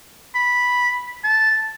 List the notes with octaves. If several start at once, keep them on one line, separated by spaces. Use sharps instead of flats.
B5
A5